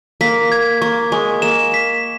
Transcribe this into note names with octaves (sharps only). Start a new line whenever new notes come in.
A#3 B6
G#6
A#3 C#6
G#3 C#6
A#3 E7
B6